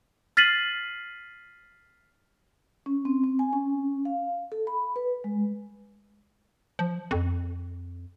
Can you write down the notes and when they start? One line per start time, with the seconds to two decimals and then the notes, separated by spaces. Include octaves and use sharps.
0.37 F6 A6 B6 C7 D#7 F#7
2.86 C#4
3.05 C4
3.24 C4
3.39 G#5
3.53 C#4
4.05 F5
4.52 A4
4.67 B5
4.96 B4
5.24 G#3
6.79 F3
7.11 F2